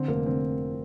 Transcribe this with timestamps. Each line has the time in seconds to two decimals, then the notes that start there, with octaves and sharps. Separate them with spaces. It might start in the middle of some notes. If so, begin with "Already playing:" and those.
Already playing: D3 C4
0.08 F1 A#3
0.26 D3 C4